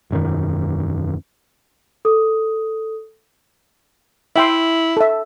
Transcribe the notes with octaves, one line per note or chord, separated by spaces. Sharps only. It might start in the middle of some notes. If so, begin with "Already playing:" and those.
E1 F#2 D#3
A4 D#6
E4 E5 G5 C6
A4 E5